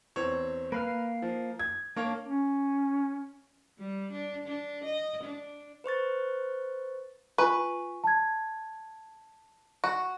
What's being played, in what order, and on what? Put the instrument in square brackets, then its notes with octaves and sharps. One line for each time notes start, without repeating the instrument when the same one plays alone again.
[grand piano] E2 C4 C#5
[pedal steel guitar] A#3 F5 F6 [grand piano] B4
[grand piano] F3
G#6
[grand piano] A#3 C#5 [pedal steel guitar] D4
[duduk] C#4
[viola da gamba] G3
D4
D4
D#5
D4
[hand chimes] B4 C5 C#6 A6
[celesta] F4 G#5 C#6 [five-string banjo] B4
[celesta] A5 G#6
[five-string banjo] F#4 [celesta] C#6